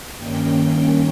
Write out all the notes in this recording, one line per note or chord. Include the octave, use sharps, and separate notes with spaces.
G2 D#3 A#3 C#4 G5